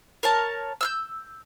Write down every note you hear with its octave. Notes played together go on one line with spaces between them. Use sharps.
A#4 C#5 A5
E6 F6 G6